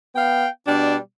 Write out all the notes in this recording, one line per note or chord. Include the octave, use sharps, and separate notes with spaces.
B3 F5 G5
B2 G3 D4